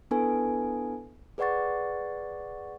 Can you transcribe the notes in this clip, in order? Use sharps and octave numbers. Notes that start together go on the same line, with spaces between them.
B3 D4 E4 A4 B4 G#5
G#4 B4 D5 F#5 C#6 A6